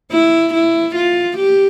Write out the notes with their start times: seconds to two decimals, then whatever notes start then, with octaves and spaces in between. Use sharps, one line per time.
0.12 E4
0.54 E4
0.95 F4
1.37 G4